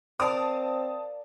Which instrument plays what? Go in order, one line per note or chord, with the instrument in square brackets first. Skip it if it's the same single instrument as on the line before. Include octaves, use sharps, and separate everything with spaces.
[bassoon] C4 [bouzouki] A#4 D5 F5 [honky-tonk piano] A5 D#6